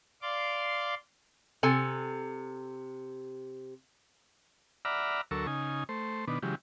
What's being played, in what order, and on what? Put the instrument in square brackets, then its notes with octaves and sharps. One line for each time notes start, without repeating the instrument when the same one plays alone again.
[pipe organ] D5 F5 C6 D6
[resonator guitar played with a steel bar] C3 A4 G#5
[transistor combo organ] D5 E5 F#5 A#5 B5 F6
D2 F#3 A4 A#4 C#6 E6
C#3 D#4 G#5
A3 C5
B2 D#3 B3 D4
C#3 E3 F#3 G#3 G4